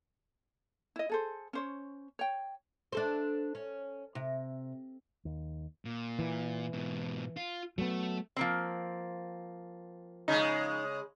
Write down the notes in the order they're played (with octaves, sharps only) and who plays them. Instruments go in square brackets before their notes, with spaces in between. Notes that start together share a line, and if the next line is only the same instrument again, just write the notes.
[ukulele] E4 D#5
G#4 A4 C5
C#4 C5 C#5
C#5 G5
[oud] D4 A4 C5
C#4
C3
[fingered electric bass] D#2
[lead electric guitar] A#2
[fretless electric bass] E3
[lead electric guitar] G#2 B2
F4
[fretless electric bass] F#3 B3 [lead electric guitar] A3
[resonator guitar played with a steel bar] F3 A#3 C4
[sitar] C#3 G#3 [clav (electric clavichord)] D#4